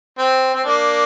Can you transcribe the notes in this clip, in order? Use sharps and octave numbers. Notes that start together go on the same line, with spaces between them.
C4
C4
A#3 D4